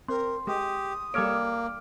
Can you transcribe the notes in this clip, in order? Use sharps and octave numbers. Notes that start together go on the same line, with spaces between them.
C4 A#4 C6
G#3 G4 D#6
G3 A#3 A4 C#5 D6 F6 D7